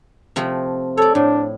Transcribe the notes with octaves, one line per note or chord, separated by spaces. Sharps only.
C3 F3 A3
A4 C#5 D5
A2 D4